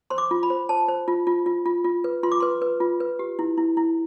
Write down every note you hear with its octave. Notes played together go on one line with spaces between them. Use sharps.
C5 C6
D6
F4
B5
C5
C5 A5
C5
F4
F4
F4
F4
F4
B4
F4 C6
D6
B4 C6
B4
F4
B4
G4
E4
E4
E4